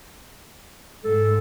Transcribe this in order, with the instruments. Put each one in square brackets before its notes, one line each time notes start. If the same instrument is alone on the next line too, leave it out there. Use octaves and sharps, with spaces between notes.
[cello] G#2 [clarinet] A4